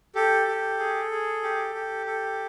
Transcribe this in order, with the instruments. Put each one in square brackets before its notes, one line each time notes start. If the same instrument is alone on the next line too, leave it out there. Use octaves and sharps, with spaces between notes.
[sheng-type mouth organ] G4 A4
G4
G#4
G#4
G4
G4
A4